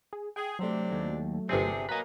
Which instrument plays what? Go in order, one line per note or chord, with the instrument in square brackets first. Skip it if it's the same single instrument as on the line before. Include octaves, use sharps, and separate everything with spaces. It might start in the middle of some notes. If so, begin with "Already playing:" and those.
[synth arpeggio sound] G#4
[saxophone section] G#4 [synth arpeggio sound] G5
[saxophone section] C3 C4 D4 [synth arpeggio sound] F#3 A3
[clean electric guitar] D#2
[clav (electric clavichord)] G1 C4 [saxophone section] C3 [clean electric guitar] D4 G#4
[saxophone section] F#3 A#3 [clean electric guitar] B4 D#5 [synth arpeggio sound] G#5 A#5